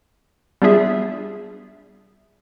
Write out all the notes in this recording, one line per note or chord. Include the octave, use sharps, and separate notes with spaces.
G3 B3 D4 F4 G#4 E5